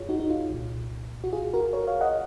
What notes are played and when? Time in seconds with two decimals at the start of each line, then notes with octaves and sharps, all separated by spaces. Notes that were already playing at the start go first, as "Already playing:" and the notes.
Already playing: F2 F4 G#4 C#5
0.09 D#4 F#4
0.20 D#4
0.30 F4
0.50 C2 A#2
1.24 F#4
1.33 F4 G#4
1.54 F#4 A#4
1.73 A#4 C#5
1.87 C#5 F5
2.01 D#5 F#5